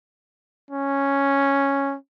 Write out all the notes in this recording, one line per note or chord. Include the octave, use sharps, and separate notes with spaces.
C#4